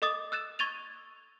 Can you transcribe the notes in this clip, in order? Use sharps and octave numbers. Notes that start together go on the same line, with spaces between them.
A4 D#5 D6 D#6 A6
E6 F#6 A6 E7
C#6 G#6 A6 D#7 F7